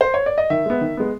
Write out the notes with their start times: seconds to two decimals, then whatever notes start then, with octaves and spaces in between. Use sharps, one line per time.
0.01 C5
0.14 C#5
0.26 D5
0.38 D#5
0.50 D#3 E5
0.66 G#3 B3
0.81 D#3
0.97 G#3 B3